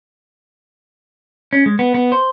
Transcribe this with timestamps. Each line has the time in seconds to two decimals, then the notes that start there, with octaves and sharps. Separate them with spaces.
1.53 C#4
1.66 G#3
1.79 B3
1.94 B3
2.12 C5